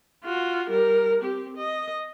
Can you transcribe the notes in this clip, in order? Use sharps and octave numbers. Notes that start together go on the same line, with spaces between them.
F4 F#4
G3 A#4
C4 G4
D#5